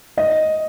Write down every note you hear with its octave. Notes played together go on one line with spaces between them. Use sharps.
D#5